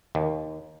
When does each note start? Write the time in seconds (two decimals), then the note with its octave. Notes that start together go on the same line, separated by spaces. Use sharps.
0.15 D#2